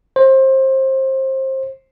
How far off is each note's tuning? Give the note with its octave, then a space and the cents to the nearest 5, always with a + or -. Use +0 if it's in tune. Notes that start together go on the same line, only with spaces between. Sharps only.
C5 +25